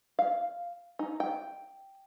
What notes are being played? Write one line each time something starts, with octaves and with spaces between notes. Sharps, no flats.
F5
D#4
G5